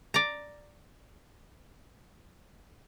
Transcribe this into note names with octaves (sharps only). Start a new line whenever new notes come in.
D5 A#5